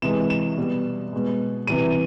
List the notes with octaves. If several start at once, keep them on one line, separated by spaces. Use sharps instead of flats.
C3 E3 G#3 E7
E7
B2 G3
B2 G#3
C3 E3 G3 D#7